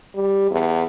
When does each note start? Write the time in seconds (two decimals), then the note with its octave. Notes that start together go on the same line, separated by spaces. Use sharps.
0.15 G3
0.51 E2